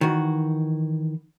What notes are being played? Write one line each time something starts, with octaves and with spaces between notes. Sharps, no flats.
D#3 E3 F#4